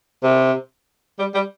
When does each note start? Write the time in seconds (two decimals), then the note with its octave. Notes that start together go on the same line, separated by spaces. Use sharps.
0.23 C3
1.19 G3
1.34 G3